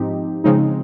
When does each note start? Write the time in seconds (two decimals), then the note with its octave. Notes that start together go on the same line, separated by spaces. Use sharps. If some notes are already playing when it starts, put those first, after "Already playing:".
Already playing: G#2 F3 C4 D#4 G4
0.44 C#3 F3 G#3 C4 D#4